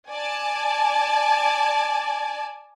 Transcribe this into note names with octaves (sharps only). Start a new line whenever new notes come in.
D5 G#5 A5